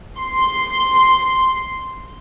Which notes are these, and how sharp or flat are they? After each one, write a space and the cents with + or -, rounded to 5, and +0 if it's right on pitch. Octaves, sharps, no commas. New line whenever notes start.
C6 -5